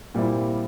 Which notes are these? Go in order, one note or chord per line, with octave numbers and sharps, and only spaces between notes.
A#2 G3 C4 E4